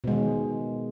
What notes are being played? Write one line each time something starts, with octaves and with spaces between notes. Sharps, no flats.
B2 D#3 G#3